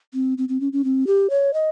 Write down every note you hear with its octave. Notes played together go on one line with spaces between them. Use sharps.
C4
C4
C4
C#4
C#4
C4
G4
C#5
D#5